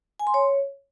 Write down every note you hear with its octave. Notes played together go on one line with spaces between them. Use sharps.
G#5
C6
C#5